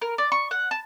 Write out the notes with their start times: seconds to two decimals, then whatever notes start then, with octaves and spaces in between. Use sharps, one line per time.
0.02 A#4
0.18 D5
0.32 C#6
0.51 F#5
0.71 A5